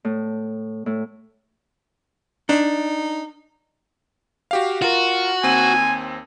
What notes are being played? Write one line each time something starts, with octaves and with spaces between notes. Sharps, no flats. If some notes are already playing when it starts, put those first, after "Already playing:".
A2
A2
D4 D#4
F#4 G4 F5
F4 F#4 A#4
D#2 C4 G#5 D#7